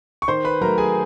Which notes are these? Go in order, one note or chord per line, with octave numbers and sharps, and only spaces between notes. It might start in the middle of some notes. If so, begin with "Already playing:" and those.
C#6
D#3 C5 C6
B4 B5
F#3 A3 A#4 A#5
G#4 G#5